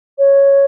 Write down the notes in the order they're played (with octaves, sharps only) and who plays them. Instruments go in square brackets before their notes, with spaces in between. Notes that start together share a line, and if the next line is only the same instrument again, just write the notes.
[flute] C#5